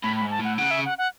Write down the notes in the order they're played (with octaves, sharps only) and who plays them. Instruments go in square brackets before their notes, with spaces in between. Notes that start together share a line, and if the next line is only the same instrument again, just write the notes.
[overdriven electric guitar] A2 [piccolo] B5
[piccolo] B5
[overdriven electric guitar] G#2
[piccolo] A5
[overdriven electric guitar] A2 [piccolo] F#5
[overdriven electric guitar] C#3 [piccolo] F#5
[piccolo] E5
F#5
F#5